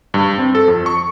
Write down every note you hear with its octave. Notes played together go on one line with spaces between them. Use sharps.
G2
C4
A4
F2
C#6